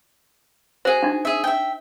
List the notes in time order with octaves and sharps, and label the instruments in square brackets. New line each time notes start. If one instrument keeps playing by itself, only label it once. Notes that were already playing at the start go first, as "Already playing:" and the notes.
[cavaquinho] F#4 G#4 [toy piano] C5
[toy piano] D4 D#4
[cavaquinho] G#4 E5
E5 G5